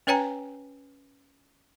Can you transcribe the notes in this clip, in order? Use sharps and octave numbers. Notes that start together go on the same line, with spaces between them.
C#4 B4 C#5 G5 G#5 A#5